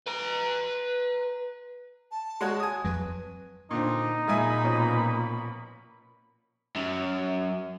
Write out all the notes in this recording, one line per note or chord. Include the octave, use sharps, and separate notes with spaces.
B4 A#5
A5
G#3 F#4 C#5
G#5 D#6
F2 F#3 B4
A#2 D3 C4 D#4
A#2 G#4 E5 G#5 B5
B2 F3 C#4
F#2